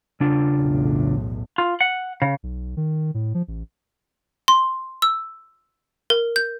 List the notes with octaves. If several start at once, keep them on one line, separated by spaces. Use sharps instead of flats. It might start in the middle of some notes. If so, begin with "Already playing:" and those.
C#3 D4 F4
B1 E2 A2
F4
F#5
C#3
B1
D#3
A2
F3
A1
C6
E6
A#4
G6